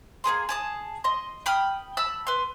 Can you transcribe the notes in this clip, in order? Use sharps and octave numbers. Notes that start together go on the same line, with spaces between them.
A#3 B3 G#4 C6
G#4 A5 D#6
D#5 C6
G5 B5 D#6 F6
A5 B5 E6
B4 C6